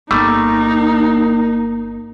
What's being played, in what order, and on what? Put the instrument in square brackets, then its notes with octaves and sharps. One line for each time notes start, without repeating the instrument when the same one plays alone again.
[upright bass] G1 [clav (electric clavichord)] G3 A3 [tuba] A#3 [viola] D#4